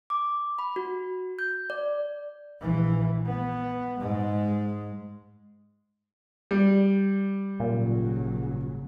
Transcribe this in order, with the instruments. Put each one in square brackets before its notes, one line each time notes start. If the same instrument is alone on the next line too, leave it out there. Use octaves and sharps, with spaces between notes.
[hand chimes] D6
B5
F#4
G6
D5
[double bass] A#1 E3
B3
G#2 G#3
[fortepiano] G3
[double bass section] G#1 C#3 F#3 [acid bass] A#2